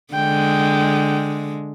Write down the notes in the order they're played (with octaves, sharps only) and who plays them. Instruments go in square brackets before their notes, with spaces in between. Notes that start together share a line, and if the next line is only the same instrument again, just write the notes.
[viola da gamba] D3 G#3 [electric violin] G5